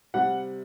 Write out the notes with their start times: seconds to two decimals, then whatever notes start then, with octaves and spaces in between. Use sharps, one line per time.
0.14 C3 G3 F#5